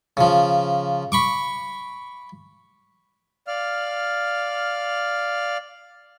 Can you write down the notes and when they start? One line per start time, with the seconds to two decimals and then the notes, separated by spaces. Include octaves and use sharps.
0.17 C#3 F3
1.12 B5 C#6 D6
3.47 D5 F5 F6